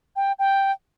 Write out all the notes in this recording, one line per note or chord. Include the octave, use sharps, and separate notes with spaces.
G5
G5